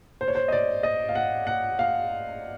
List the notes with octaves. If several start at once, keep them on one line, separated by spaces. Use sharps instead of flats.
C5
C#5
C5
D#5
D5
D#5
F5
F#5
F#5
F5